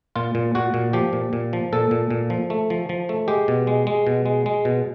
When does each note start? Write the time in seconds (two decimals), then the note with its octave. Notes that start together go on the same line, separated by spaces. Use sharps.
0.16 A#2 F4
0.35 A#2
0.55 A#2 F#4
0.74 A#2
0.93 F3 G4
1.13 A#2
1.33 A#2
1.53 F3
1.73 A#2 A4
1.91 A#2
2.11 A#2
2.30 F3
2.50 A3
2.70 F3
2.89 F3
3.09 A3
3.28 G#3 G4
3.48 B2
3.67 G#3
3.87 G#3
4.07 B2
4.26 G#3
4.46 G#3
4.65 B2